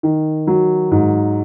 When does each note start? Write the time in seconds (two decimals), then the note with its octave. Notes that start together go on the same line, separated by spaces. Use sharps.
0.03 D#3
0.47 F#3
0.91 G#2